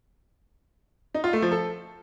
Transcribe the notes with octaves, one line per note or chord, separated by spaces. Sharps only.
D#4
F4
A3
F3
A4